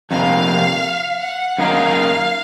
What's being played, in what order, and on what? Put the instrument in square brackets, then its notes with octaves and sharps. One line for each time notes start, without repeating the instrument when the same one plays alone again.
[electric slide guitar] F2 C3 A#3 [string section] F5
[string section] F#5
[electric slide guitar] F#2 D#3 A#3 D#4 [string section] F5